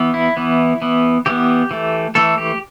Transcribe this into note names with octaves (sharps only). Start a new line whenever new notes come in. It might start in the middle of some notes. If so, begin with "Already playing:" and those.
Already playing: E3 B3
E4
E3 B3
E3 B3
E3 B3 G4
E3 A3
E3 A3 A4
G4